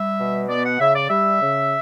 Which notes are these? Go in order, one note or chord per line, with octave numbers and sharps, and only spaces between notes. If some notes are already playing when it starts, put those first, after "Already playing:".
Already playing: G3 E5
B2
B3 D5
F#5
C#3 E5
D5
G3 E5
C#3